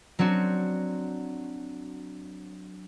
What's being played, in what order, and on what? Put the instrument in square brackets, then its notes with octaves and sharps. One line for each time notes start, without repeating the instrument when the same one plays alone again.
[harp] F#3 C4 D4 F#4